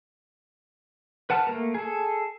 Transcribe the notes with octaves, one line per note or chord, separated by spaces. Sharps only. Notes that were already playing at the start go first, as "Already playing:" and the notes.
B4 F#5 A5 F6
A3 A#3 A#4
G#4 A4